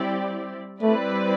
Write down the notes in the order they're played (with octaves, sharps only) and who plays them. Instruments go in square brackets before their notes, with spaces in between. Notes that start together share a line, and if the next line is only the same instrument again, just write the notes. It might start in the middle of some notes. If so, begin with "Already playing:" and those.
Already playing: [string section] G3 C4 E4 G4 D5
[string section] G3 C4 E4 B4 D5 [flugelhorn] A3